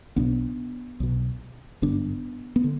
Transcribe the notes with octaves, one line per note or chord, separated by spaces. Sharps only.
B1 B2 B3 D4
B1 B2
G#1 G2 D3 B3 D4
B3
D3